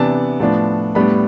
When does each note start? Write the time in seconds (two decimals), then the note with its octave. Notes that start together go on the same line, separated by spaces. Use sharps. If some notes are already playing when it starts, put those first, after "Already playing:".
Already playing: C3 E3 B3 D4 A5
0.40 A2 F3 B3 D4
0.95 A2 G3 B3 D4 B5